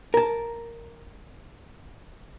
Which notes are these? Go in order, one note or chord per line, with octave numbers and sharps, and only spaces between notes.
A#4 A5